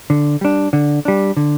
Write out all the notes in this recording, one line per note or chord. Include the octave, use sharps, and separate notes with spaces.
D3
G3 D4
D3
G3 D4
D3